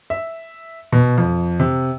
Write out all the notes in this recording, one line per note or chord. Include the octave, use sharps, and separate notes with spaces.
E5
B2
F2
C3